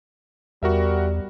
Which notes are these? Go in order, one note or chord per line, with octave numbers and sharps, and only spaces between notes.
E2 G3 F#4 A#4 E5